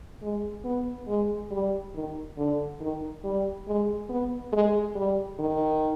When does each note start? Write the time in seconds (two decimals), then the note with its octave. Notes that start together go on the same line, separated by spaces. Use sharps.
0.22 G#3
0.65 B3
1.08 G#3
1.51 G3
1.95 D#3
2.38 D3
2.81 D#3
3.24 G3
3.67 G#3
4.09 B3
4.53 G#3
4.95 G3
5.39 D#3